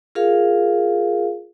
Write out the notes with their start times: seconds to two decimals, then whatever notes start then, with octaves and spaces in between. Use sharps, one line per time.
0.15 F4 G#4 A#4 F5